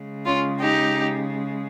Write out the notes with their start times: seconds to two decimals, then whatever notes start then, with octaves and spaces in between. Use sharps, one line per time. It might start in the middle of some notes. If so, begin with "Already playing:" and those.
Already playing: C#3 G#3
0.26 C#4 F4
0.60 D#4 G4